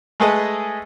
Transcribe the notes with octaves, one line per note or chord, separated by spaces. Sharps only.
G#3 A3 G#4 A4 B4 D#5